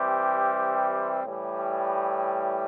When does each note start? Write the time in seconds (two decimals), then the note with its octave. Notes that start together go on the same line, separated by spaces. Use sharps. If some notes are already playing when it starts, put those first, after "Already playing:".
Already playing: E3 G3 C4 G4
1.23 A2 E3 G3